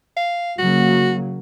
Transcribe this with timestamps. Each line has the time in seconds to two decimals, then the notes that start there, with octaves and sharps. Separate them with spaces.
0.17 F5
0.59 C#3 F#3 A#3 F#4